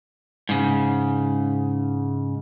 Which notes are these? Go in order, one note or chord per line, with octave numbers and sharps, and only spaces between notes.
G#2 C#3